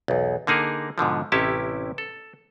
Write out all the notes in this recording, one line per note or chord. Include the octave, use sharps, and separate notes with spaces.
B1 E2
D3 A#3 D#4 G#4 A#4
G#2 B2 D3 F3
A1 C3 C#4 E4 G4 A5
A4